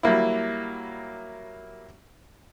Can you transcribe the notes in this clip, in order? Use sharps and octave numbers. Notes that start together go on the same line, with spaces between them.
F#3 G3 A#3 E4